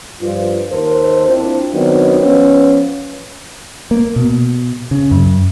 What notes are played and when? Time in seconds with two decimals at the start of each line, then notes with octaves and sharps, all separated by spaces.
0.21 G2 F3 F4
0.71 D#2 A4 A#4 C5
1.27 C4 D4 E4 F4
1.73 D#3 F#3 B3 C4 D4
2.20 F3 B3 C#4
3.91 A#3
4.16 B2
4.91 C#3
5.11 F#2